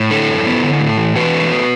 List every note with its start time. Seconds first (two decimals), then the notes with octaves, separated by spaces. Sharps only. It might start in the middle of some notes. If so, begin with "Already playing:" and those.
Already playing: A2
0.11 D3 E4 A4
0.28 F#2
0.46 B3
0.63 D3
0.80 A2
0.97 E3
1.16 E3 F#4 B4
1.33 A3
1.50 A3